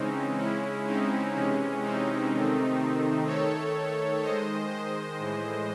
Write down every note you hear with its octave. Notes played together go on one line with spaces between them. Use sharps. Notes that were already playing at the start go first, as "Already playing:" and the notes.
Already playing: C#3 E3 G#3 C4 C#4 D#4
C#3 G#3 C#4 E4
C4 D#4
C3 E3 G#3 C#4
C4 D#4
C3 D#3 A3
D#3 A3 A4 C#5
D#3 G#3 C5 D#5
C5 D#5
A2 E3 G#3